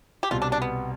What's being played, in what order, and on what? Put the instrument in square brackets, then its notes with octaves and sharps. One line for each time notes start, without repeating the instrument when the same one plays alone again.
[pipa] G4
[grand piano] C2 B2 G3 [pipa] F4
[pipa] D4
D4
B3